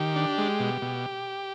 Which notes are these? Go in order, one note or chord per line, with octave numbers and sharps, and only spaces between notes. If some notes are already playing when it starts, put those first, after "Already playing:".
Already playing: D#3 G4
D4
G#3
B2
B2